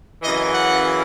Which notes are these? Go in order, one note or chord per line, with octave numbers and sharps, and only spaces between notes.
F#2 C#3 E3 D#5
F#5